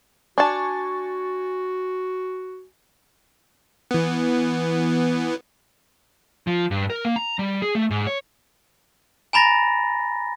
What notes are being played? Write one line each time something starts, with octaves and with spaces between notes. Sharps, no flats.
D4 F#4 G#5 A5 C#6 A6
E3 B3
F3
G2
A#4
A#3
A#5
G3
G#4
A3
G#2
C#5
G#5 A#5 B5 A6 A#6